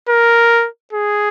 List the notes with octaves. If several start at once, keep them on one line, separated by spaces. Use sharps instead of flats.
A#4
G#4